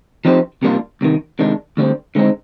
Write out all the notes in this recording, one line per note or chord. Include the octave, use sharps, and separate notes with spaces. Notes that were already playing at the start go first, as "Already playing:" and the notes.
F3 C4 D#4 G4 C5
C3 G3 A#3 D4 F4
C2 C3 D#3
C3 D#3 G#3 D4
D2 D3 G3 C4
D3 G#3 C4 D#4